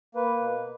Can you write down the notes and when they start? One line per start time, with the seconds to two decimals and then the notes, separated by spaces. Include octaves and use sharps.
0.15 A#3 B4
0.40 B2